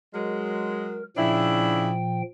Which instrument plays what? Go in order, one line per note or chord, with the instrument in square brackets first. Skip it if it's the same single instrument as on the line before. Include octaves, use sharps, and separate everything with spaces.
[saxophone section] F#3 G#3 [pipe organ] A#4
[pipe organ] A#2 F3 G5 [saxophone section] C#3 D4 E4